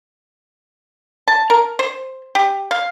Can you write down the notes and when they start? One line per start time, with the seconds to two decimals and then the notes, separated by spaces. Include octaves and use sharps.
1.28 A5
1.50 A#4
1.79 C5
2.35 G4
2.71 F5